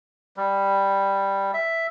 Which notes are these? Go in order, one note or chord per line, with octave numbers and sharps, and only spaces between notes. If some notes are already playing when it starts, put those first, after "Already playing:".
G3
E5